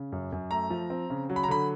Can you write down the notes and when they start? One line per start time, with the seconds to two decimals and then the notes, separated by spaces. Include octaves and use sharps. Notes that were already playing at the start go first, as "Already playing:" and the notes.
Already playing: C#3
0.12 F#2
0.32 F#2
0.51 A3 A#5
0.70 F3
0.90 C4
1.10 C#3
1.30 F#3
1.36 B5
1.43 A#5
1.48 D3 B5